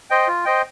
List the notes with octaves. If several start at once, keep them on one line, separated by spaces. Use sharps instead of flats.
C5 D#5 G5
F4
C5 D#5 G5